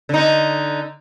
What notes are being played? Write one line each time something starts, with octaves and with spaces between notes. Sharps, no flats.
D3 D#4